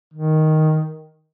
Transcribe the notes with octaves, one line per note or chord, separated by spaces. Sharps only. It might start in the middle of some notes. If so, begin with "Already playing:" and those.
D#3